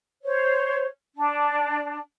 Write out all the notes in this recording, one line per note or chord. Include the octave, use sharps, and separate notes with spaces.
C5 C#5
D4